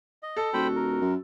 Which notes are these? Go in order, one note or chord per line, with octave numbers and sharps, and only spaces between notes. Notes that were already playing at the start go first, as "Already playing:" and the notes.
D#5
A4
D#1 F#4 C5 G5 B5
A#4
F#2